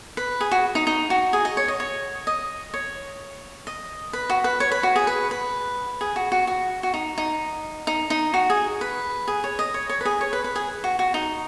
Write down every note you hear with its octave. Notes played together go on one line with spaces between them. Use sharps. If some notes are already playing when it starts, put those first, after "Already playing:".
B4
G#4
F#4
D#4
D#4
F#4
G#4
D#5
C#5
D#5
C#5
D#5
C#5
D#5
B4
F#4
B4
C#5
B4
F#4
G#4
B4
B4
G#4
F#4
F#4
F#4
F#4
D#4
D#4
D#4
D#4
F#4
G#4
B4
G#4
C#5
D#5
C#5
C#5
B4
G#4
C#5
B4
B4
G#4
F#4
F#4
D#4